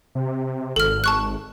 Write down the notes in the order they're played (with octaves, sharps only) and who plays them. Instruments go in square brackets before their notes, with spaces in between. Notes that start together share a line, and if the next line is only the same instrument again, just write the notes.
[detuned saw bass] C3
[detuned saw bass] G#1 [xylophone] A4 F6
[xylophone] A5 C#6 F#6